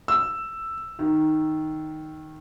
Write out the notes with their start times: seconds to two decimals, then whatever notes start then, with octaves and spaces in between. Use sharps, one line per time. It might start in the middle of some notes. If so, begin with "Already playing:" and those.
0.08 E6
0.99 D#3